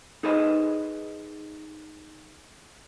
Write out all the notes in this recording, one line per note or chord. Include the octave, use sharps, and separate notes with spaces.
D#4 G#4 A4 B4 C5 D#5